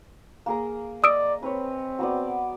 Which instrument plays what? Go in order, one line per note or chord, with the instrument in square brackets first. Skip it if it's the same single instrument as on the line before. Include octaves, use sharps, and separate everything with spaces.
[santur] A#3 G#4 A#5
[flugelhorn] D5 [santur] D#5 [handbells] D#6 E6 D7
[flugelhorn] C4 [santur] B4 C#5
[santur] F#3 B3 D5